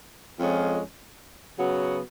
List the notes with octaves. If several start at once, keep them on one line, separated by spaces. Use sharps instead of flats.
F2 F3 G#3 C#4
C#3 F#3 B3 F#4